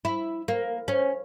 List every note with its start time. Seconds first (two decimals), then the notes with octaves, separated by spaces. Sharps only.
0.05 E4
0.48 A#3
0.88 C#4